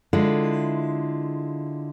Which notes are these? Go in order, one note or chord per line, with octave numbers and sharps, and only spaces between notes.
D3 G#3 E4 F4